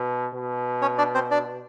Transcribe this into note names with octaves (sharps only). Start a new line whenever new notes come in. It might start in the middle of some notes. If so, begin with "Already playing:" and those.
Already playing: B2
B2
C#4 C#5
D4 D5
C4 C5
D4 D5